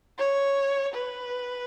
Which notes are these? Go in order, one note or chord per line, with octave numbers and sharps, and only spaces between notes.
C#5
B4